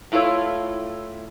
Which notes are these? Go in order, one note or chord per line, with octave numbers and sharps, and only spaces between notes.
A2 E4 F4 A4 C#5